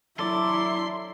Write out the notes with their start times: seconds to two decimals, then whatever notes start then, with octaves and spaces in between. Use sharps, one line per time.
0.19 F#3 E4 A4 D5 C6